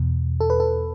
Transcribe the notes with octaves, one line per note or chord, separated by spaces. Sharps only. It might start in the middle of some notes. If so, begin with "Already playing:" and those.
Already playing: E2 B2
A4
B4
A4